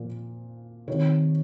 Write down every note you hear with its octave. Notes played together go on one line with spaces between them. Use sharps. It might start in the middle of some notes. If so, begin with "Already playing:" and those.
Already playing: A#2 F3
C3 D#3 C#5